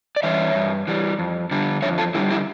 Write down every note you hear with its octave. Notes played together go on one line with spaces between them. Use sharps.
D5
E3 G3 C#5 E5
G2
E3 G3
F2
D3 G3
F2 C#5 E5
F4 A4
D3 G3 E4 G4
E4 G4